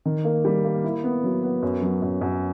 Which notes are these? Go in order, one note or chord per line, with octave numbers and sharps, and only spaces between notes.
D#3
A#3
G3
A#3
E4
B3
F#3
B3
F#2
F#3
F#2
F#2